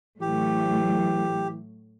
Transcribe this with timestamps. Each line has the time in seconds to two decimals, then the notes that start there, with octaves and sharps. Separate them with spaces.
0.21 A2 E3 F#3 A3 G4